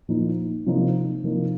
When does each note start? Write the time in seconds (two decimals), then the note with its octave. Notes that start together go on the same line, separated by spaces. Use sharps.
0.08 A#2 F3 A#3 D#4
0.66 C3 F3 A#3 D#4
1.24 C3 F3 A#3 D#4